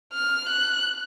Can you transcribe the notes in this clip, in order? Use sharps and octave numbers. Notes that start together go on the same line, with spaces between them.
F6
F#6